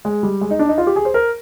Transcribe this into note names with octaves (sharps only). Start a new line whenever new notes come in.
G#3
G3
G#3
D#4
D4
D#4
F4
G4
G#4
C5
A#4